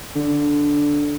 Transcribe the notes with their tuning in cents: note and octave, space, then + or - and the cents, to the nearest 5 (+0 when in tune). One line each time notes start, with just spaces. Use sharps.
D3 -5